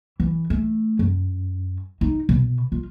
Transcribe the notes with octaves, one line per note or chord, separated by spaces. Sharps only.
E3
A3
F#2
D#4
B2
F4